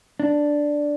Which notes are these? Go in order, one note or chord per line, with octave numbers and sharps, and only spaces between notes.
D4